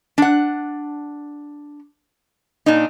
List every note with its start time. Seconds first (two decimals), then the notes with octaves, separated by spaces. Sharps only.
0.18 D4 F#5
2.66 A#2 D4 D#4